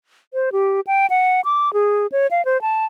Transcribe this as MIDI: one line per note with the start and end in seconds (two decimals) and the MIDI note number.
0.34 0.50 72
0.52 0.81 67
0.87 1.06 79
1.10 1.41 78
1.45 1.72 86
1.73 2.07 68
2.12 2.27 73
2.31 2.44 77
2.45 2.60 72
2.62 2.85 81